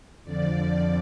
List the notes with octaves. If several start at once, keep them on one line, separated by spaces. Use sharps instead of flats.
F2 D3 F3 D5